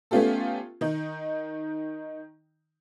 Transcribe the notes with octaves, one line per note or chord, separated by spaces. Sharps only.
A3 B3 C#4 F4 G4 A4
D#3 D#4